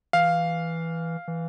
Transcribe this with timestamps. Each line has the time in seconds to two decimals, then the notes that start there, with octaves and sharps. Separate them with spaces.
0.13 E3 F5
1.28 E3